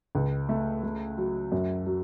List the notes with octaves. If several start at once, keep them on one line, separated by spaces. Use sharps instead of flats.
C#2
A3
A3
F#3
F#2
F#3